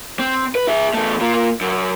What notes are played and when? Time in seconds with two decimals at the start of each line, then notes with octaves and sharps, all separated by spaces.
0.19 C4
0.55 B4
0.68 G#4 E5
0.94 E2 A3
1.21 A#3 F4
1.61 F#2